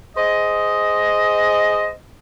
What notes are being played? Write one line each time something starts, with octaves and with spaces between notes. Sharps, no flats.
G#4 C5 D#5